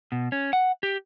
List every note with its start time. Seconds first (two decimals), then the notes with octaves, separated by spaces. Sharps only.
0.12 B2
0.32 C#4
0.53 F#5
0.83 G4